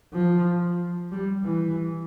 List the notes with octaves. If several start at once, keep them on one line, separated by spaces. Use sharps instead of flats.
F3
G3
E3